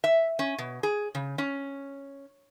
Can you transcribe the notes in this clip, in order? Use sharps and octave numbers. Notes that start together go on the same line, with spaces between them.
E5
C#4
B2
G#4
C#3
C#4